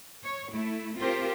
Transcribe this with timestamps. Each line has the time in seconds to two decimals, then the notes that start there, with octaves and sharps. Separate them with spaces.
0.23 C#5
0.52 A3 E4
0.98 C4 F4 G4 A#4 C5